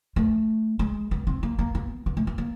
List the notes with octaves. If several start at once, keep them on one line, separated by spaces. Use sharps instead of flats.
A3
G#3
B3
C4
A#3
A#3
B3
B3
A3
B3
A#3